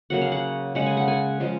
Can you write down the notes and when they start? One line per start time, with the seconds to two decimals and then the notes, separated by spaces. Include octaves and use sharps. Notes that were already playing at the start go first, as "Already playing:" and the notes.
0.10 C#3 F#3 A#3 F#5
0.22 F5
0.32 F#5
0.75 C#3 G#3 F#5
0.86 G#5
0.97 F#5
1.08 G#5
1.40 C#3 F3 G#3